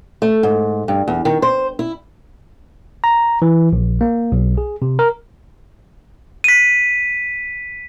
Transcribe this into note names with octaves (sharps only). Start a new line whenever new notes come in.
A3
G#2
G2
E2
D#3
C5
E4
A#5
E3
A#1
A#3
B1
G#4
C3
A#4
B6 D#7